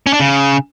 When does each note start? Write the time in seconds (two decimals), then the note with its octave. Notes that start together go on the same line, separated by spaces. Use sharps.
0.07 C#4
0.13 D4
0.20 C#3